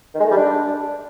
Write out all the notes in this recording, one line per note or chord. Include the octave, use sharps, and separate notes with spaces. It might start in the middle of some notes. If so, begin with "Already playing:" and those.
D#3
G#3
A3
G3
D4